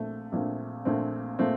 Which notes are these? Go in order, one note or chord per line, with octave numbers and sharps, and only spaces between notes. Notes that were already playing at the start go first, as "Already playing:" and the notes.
Already playing: A#1 A#2 A3 C4
A#1 A#2 A3 C4
A#1 A#2 A3 C4
A#2 A3 C4